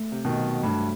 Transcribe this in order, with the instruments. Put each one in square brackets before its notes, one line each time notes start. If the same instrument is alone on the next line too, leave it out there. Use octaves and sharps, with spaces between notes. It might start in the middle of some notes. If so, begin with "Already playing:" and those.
Already playing: [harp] A3
C3
[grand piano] B2 D#3
[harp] F#3
[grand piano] G2 [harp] A3